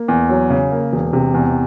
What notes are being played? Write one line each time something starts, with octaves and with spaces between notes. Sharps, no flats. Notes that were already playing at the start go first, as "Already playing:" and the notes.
Already playing: A#3
E2
F#3
C#3
A#3
E1
C3
E2